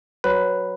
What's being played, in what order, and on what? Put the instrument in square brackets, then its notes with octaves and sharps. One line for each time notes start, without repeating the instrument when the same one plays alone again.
[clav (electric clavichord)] F#3 B4